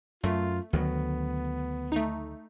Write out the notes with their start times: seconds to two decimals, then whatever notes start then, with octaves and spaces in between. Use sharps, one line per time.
0.24 F#2 A3 F4
0.73 D2 D#3 F#3 B3
1.92 A3 D#4